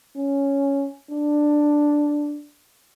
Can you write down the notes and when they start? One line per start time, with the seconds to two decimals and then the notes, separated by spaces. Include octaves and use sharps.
0.17 C#4
1.11 D4